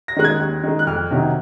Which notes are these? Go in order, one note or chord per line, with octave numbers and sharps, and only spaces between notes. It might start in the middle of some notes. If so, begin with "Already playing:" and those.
A#6
D#3 G#3 F#6
G#6
D#2
D#3 G#3
F#6
F2 F6
C3 D#3 F#3